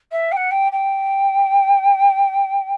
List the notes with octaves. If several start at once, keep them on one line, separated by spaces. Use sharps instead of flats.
E5
G5
F#5
G5
G5